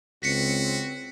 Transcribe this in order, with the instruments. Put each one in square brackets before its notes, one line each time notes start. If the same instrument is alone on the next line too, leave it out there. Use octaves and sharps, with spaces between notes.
[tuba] C#2 [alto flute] C4 [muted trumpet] F#4 [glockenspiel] B6 C#7